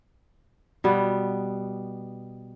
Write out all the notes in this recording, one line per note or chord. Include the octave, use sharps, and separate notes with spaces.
B2 G3 B3